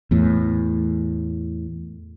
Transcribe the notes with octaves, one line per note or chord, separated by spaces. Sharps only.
E2 A2